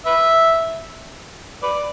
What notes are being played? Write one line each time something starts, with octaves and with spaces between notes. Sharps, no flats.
B4 E5
B4 D5